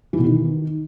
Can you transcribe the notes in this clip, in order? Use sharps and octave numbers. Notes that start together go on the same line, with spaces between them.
E3
B2
D#3